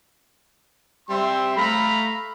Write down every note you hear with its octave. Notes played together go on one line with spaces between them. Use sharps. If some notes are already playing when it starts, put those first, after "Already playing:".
G3 C4 E5 C6
A3 F5 A#5 B5